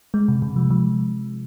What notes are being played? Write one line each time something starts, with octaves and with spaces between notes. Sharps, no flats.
G#3
C3
C3
F3
F3